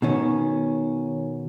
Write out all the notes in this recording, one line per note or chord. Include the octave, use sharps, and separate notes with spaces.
B2 D#3 C#4